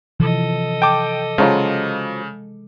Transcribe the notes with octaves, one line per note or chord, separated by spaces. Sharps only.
C3 E3 F3 A4 D#5
G5 A5 D6
C#3 F3 F#3 G#3 F4